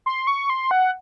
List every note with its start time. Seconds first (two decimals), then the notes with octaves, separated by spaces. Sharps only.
0.06 C6
0.27 C#6
0.50 C6
0.71 F#5